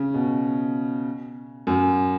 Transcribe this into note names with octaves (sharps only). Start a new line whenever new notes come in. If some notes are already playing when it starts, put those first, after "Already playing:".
Already playing: C#3
B2
F#2